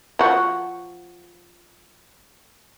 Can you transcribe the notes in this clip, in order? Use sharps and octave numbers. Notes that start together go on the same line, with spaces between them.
F3 F#4